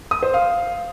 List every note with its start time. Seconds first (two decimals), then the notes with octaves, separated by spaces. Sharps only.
0.11 D#6
0.22 C5
0.34 F5